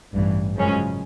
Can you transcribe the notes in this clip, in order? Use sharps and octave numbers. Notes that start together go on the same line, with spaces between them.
A1 G2 E3
F#2 C#3 F3 G#3 C#4